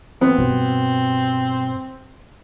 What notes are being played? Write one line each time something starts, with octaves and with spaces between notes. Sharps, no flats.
E3 B3 C4
G2 B2 G3